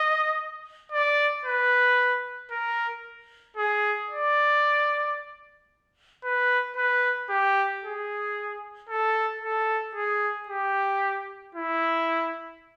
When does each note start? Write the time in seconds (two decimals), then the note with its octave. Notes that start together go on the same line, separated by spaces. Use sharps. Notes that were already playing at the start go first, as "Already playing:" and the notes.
Already playing: D#5
0.92 D5
1.45 B4
2.51 A#4
3.57 G#4
4.10 D5
6.23 B4
6.76 B4
7.30 G4
7.83 G#4
8.89 A4
9.42 A4
9.95 G#4
10.48 G4
11.55 E4